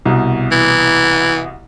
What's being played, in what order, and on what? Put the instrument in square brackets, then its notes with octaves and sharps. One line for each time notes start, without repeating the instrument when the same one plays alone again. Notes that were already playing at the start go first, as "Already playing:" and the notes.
[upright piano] C2 B2
[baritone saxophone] E3